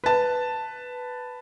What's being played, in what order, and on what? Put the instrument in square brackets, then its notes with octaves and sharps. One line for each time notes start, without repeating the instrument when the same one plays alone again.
[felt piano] B4 A5